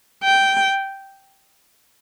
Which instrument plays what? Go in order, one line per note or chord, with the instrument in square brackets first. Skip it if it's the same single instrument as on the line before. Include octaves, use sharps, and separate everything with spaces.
[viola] G5